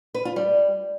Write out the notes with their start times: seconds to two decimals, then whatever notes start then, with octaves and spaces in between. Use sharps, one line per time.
0.14 B4
0.25 F4
0.36 G3